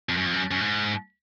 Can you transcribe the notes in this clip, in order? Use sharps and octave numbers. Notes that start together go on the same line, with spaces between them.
F2
F#2
F2
F#2
F#2
G#2